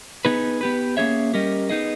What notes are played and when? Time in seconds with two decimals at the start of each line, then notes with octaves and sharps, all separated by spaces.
0.25 B3 D#4 G#4 B4
0.61 B3 G4 B4
0.97 A#3 C#4 G#4 C#5 E5
1.34 G3 C#4 G4 A#4 D#5
1.70 B3 D#4 G#4 D#5